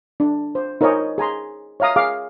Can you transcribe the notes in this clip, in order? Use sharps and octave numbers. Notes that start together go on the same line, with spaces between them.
D4
C5
D#4 A#4 C5 C#5 D#5 G#5
G#4 G#5 A#5 C6
C#5 E5 F5 A#5 D#6
G#4 F5 D6